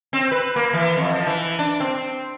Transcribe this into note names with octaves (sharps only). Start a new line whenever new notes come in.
C4
B4
A#3
E3
F2
F3
E3
D4
C4